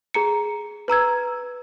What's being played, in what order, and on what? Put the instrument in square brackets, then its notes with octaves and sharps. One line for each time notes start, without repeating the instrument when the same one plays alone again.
[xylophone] G#4 A#5 C#7
B4 A#5 E6 G#6